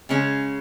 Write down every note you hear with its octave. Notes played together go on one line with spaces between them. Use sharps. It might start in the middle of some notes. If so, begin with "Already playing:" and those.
C#3 G#3 C#4